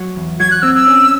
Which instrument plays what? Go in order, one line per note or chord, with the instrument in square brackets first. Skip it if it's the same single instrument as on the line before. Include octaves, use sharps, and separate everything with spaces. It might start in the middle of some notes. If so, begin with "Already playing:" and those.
Already playing: [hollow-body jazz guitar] F#3
E2
[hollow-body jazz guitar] F#3 [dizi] G#6
[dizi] F#6
[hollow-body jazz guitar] C4 [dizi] E6
[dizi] E6
[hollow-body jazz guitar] C#4